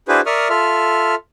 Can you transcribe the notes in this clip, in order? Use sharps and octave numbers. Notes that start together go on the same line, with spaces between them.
D4 E4 F#4 G#4 B4 C5
A#4 D5 E5 C#6 D#6 F6
F4 A4 E5 F6